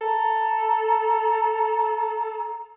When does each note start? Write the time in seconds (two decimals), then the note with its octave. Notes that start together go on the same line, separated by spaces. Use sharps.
0.01 A4 A#5